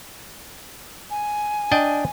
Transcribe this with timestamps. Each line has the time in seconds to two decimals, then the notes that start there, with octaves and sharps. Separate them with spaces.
1.10 G#5
1.72 D4 D#5 G5